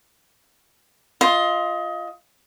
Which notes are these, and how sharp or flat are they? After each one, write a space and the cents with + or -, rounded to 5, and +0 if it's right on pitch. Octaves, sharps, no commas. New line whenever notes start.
F4 +0 D#5 +25 C6 +0